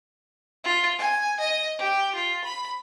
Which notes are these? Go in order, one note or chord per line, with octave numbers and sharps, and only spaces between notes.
F4
G#5
D#5
G4
F4
B5